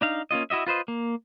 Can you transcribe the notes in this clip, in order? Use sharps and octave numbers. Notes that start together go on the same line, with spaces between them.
D4 D#4 F5
A#3 C#4 F4 D#5
E4 F#4 D#5 E5
F4 B4 C5 D#5
A#3